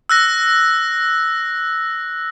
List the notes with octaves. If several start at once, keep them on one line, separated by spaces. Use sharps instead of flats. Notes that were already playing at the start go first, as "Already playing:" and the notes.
E6 F#6 A#6